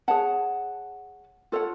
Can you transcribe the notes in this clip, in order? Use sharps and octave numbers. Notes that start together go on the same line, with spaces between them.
G#4 C#5 F#5 A5
F4 A4 C#5 F#5